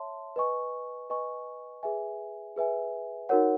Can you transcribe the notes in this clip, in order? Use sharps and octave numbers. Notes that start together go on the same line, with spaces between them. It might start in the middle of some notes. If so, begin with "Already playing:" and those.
Already playing: C#5 E5 A5 C6
B4 D#5 G#5 C#6
B4 D#5 G#5 C#6
G#4 B4 E5 G#5
G#4 B4 E5 G#5
D#4 F#4 A#4 C#5 F#5